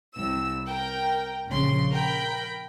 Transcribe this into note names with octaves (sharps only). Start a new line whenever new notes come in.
C2 E6
A#4 G5
A#1 C#3 C6
A#4 G5 B5